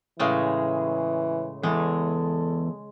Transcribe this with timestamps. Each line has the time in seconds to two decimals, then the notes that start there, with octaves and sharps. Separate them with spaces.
0.19 A2 C#3 E3 G#3
1.63 E2 G#3 A4